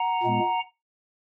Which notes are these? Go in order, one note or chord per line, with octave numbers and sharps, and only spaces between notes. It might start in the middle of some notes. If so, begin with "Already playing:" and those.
Already playing: F#5 A#5
A#2 G#3 B3